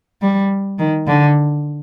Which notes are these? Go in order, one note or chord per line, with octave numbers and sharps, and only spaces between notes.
G3
D#3
D3